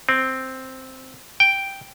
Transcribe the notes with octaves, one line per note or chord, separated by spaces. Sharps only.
C4
G5